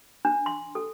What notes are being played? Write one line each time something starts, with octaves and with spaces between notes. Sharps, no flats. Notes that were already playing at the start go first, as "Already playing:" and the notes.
D4
C6
A4